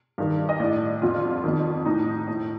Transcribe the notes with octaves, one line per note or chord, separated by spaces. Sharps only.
G2 D#3
D#5
A2 D5
F2 D3 F4
F2 D#3
A2 D#4
A2